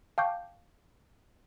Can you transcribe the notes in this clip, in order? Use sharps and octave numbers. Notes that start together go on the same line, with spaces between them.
F5 G5 A5 C#6 D6 G6